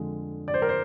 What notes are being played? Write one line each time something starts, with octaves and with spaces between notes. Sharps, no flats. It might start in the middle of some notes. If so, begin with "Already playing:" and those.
Already playing: F2 D3 G#3
D5
C5
A#4
C5